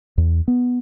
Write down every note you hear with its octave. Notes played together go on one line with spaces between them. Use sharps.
E2
B3